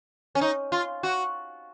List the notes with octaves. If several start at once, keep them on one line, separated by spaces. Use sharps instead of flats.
C#4
D#4
F4
F#4